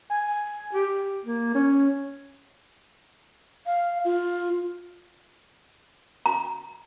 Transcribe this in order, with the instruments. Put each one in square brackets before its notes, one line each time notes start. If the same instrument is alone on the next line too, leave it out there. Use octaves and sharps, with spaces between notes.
[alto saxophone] G#5
G4
A#3
C#4
[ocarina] F5
F4
[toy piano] A#5